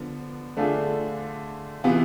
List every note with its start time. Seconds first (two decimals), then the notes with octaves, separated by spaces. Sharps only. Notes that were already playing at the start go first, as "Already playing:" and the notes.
Already playing: D3 F3 B3
0.57 D3 A3 D4 F4 G#4
1.84 C3 E3 B3 F4